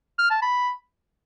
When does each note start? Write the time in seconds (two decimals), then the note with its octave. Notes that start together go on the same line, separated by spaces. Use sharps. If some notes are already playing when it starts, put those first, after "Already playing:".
0.19 F6
0.31 A5
0.42 B5